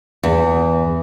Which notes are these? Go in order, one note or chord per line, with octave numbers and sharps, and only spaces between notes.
E2